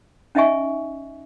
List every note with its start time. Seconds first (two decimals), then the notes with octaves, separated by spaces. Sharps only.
0.35 C#4 D#4 D#5 E5 G#5 C#6